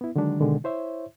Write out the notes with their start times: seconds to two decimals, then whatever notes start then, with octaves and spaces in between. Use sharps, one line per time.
0.01 B3 E4
0.16 D3 D#3 F#3 G#3 D4
0.40 B2 D3 D#3 G#3
0.64 E4 C5 C#5 E5